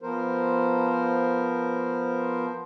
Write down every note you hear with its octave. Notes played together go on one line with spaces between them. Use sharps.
F3 B3 A#4 C5